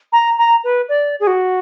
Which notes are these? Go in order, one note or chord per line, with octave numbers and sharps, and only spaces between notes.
A#5
A#5
B4
D5
G#4
F#4